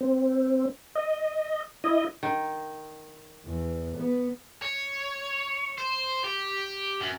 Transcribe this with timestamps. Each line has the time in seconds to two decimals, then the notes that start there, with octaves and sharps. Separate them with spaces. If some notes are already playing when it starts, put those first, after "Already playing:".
0.01 C4
0.95 D#5
1.84 E4 D#5
2.23 D#3
3.46 E2
3.96 B3
4.62 C#5
5.78 C5
6.24 G4
7.01 F#2